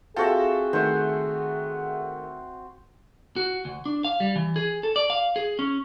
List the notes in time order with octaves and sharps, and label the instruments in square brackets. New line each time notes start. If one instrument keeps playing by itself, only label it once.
[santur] C4 F#4 E5 [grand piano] F4 A4 [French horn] G#4
[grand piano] D#3 A3 [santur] C5 F#5
[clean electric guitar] F#4
D2
D4
F5
G3
E3
G#4
A4
D5
F5
G#4
C#4